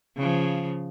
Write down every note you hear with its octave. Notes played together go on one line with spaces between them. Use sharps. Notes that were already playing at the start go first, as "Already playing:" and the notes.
C#3 F3